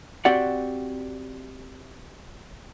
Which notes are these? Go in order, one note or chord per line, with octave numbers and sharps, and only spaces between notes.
C4 F#4 G4 D5 F#5